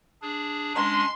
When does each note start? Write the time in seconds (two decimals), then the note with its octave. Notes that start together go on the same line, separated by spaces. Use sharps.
0.22 D4 G#4
0.75 G#3 C#4 D4 C6